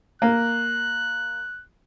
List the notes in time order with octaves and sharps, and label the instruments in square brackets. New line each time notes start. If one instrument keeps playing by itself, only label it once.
[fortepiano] A#3 [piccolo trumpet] F#6